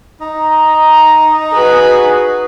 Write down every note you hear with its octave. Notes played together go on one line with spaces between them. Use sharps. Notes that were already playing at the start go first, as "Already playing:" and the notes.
D#4 A#5
F#4 G#4 B4